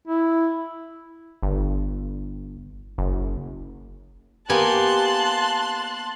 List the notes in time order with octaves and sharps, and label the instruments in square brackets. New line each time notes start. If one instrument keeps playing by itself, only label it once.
[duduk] E4
[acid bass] G1
F#1
[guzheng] A#3 B3 G#5 [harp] G4 [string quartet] A5 C6 F#6